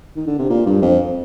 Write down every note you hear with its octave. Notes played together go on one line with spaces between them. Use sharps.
D#3
D3
C3
A#2
G2
F2